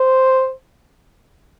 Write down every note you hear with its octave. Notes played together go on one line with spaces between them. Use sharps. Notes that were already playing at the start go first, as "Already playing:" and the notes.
Already playing: C5